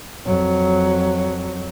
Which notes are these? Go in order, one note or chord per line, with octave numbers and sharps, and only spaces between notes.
F2 F#3